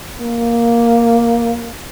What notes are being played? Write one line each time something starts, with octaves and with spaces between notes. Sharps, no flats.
A#3